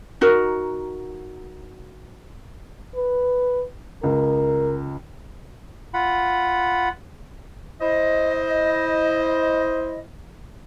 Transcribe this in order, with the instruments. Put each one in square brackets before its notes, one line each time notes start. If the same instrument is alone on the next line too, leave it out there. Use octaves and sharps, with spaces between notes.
[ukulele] D#4 F#4 A#4
[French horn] B4
[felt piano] C#2 [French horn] A#4
[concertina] F4 F#5 B5
[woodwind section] E4 C5 D#5